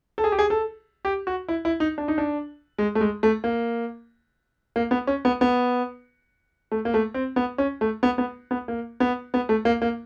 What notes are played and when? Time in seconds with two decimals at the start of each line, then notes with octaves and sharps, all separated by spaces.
0.18 A4
0.24 G#4
0.32 G4
0.39 G#4
0.50 A4
1.05 G4
1.27 F#4
1.48 E4
1.65 E4
1.80 D#4
1.98 D4
2.08 D#4
2.18 D4
2.78 G#3
2.95 A3
3.01 G#3
3.23 A3
3.44 A#3
4.76 A#3
4.91 B3
5.07 C#4
5.25 B3
5.41 B3
6.72 A3
6.85 A#3
6.94 A3
7.14 C4
7.36 B3
7.58 C#4
7.81 A3
8.03 B3
8.18 B3
8.51 B3
8.68 A#3
9.00 B3
9.34 B3
9.49 A3
9.65 A#3
9.82 A#3